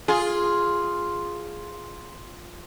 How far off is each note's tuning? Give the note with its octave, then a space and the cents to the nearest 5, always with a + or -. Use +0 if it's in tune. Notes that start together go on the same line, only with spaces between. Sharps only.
F4 +0 G#4 +0